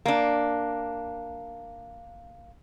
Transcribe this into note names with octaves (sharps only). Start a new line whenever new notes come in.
A#3 D4